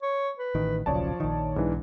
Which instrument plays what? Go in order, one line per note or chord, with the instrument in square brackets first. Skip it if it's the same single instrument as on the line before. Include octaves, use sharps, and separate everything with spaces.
[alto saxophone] C#5
B4
[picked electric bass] A1 D#3
[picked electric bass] D#1 B1 C#3 [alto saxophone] F3 [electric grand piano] C#5 D5 A5
[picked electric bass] A#1 D#3
[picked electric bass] B1 [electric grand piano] G#2 E3 [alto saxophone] D4